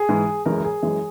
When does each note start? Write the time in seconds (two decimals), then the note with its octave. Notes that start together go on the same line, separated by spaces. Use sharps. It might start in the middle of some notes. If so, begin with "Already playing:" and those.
Already playing: G#4
0.09 G#2 E3 G#3
0.46 F#2 E3 G#3 A#4
0.58 A#4
0.64 G#4
0.83 F#2 E3 G#3